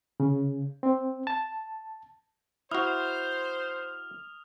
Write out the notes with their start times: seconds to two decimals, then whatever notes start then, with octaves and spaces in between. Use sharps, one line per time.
0.20 C#3
0.83 C4
1.27 A5
2.71 E4 F#4 C5 D#6 F6 F7